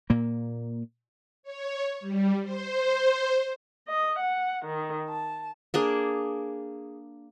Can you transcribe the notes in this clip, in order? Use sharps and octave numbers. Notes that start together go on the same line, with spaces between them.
A#2 A#3
C#5
G3
C5
D#5
F#5
D#3
A5
A#3 D4 G#4